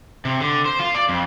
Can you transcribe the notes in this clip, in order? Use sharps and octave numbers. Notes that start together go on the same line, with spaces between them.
C3
D3
C5
F4
D5
F2